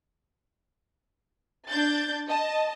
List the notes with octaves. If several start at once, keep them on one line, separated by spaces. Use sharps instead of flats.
D4 G6 A6
D#5 A5